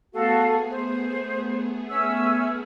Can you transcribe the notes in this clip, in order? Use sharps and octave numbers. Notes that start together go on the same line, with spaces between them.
A3 B3 F#4 G#4 A4 F5
C5
C#4 E5 E6